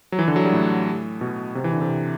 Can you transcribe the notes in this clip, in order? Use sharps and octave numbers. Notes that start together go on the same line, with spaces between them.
F#3
E3
D3
F#3
G3
A2
B2
C3
E3
D3
C3